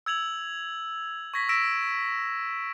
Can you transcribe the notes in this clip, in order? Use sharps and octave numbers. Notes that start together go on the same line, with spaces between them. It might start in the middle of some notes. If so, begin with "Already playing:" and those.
E6 G#6 F7 F#7
C#6 G#6 A#6 B6
E6 A#6 B6 D7 E7